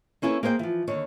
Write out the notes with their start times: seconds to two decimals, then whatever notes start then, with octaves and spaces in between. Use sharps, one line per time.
0.22 A#3 C#4 E4 A4 B4
0.43 A#3 G#4 C5 D#5 G5
0.59 E3 F3
0.88 D#2 D3 C#5